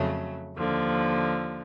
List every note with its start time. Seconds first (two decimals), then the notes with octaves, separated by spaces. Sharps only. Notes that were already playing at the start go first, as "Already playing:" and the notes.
Already playing: F2 C#3 F#3 A3
0.57 D#2 D3 F3